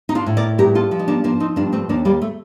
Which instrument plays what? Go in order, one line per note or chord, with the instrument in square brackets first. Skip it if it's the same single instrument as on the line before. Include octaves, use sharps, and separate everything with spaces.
[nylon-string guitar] D#4
D4 F4
A2
A#4 D5
G2 G4 A#4
F4 A4
F3
D#4
A#3 D4
F3 A#3 D4
C4 D#4
G2 A#3 D4
A3 C4
D#2 A#3 D4
G3 A#3
A3